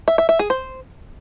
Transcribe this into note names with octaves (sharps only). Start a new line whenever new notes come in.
E5
E5
E5
G#4
C5